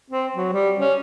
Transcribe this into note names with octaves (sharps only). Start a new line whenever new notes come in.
C4
F#3
G3
C#4